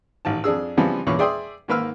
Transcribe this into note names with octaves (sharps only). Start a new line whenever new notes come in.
A1 D#3 A5
F2 D4 G#4 E6
C#3 E3 F3 G3 B3 C4
E2 A#2 C#4 B5 C#6
G#4 D5 E5 G5 C6 D#6
G#2 D#3 A#3 B4 E6 F6